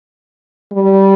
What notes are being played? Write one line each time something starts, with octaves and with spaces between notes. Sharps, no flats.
G3